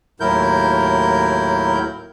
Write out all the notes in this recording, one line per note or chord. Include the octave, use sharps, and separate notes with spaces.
D#2 A2 F#3 E4 A#4 G6